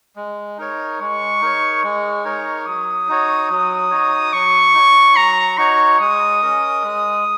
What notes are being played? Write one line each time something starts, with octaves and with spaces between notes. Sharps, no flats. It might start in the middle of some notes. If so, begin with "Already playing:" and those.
G#3
D#4 A#4 C#5
G#3 C#6
D#4 A#4 C#5
G#3 C#6
D#4 A#4 C#5
F#3 D#6
D#4 F#4 C#5
F#3 D#6
D#4 F#4 C#5
F#3 C#6
D#4 F#4 C#5
F#3 A#5
D#4 F#4 C#5 C#6
G#3 D#6
C#4 A#4 D#5
G#3